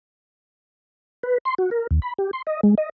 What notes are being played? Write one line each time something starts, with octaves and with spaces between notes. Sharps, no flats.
B4
C6
F#4
A#4
D#2
B5
G4
C6
D#5
G#3
D#5